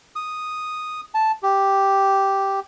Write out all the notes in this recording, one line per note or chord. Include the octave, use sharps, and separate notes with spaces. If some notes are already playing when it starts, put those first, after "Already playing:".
D#6
A5
G4